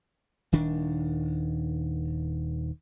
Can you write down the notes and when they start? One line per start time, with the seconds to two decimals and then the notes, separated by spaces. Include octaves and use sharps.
0.52 D#1 D#3 D4